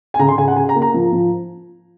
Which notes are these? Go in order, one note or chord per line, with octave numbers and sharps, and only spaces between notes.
G#5
C#3 A#5
C6
C#3 G#5
F#5
C#3 G#5
A#5
A#3
A#5
F3
F3